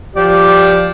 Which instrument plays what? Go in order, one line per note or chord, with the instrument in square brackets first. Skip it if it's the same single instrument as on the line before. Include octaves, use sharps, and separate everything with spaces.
[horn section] F3 D5 [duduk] G4